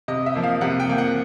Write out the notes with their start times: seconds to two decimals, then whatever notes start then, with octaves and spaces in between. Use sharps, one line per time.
0.08 C3 D#5
0.26 E5
0.35 F3 A#3
0.43 F5
0.61 C3 F#5
0.80 G5
0.89 F3 A#3
0.98 F#5